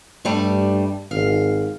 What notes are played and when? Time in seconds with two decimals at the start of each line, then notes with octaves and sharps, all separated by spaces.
0.25 G2 G3 A3 D4
1.11 G#1 F5